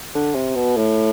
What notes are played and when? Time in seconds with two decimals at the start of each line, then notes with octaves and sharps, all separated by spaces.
0.15 D3
0.34 C3
0.55 B2
0.76 A2